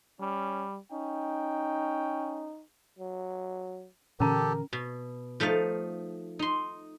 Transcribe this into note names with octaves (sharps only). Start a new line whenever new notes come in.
G3 C#4
C#4 D#4 G5
F#3
A#2 D3 E3 C#4 G4 A4 A#4 A#5
B2
F3 A3 D#4 F5
D#4 C6